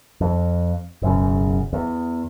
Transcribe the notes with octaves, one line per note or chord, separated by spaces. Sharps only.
F2
E1 F#2 C#3
E2